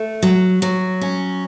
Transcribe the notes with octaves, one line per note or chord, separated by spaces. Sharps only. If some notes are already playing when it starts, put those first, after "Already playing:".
Already playing: A3
F#3
F#3
C#4